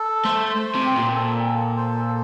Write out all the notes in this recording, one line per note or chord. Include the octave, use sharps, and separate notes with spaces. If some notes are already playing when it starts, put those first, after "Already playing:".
Already playing: A4
A3 C5
C5
C3
C4
A#2
A4
A4
C5
A4